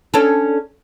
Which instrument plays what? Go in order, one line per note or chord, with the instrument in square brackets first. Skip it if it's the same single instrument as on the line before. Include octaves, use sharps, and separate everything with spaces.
[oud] C#4 D4 A4